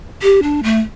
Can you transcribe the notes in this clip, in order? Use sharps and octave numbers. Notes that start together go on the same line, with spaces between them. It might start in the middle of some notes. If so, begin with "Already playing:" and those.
G4
D4
A3